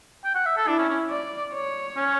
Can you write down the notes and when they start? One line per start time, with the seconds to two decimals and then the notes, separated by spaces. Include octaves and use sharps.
0.24 G5
0.35 F#5
0.46 E5
0.57 A4
0.67 D4 E4
0.79 C#4
0.89 C#4
1.11 D5
1.54 C#5
1.97 C#4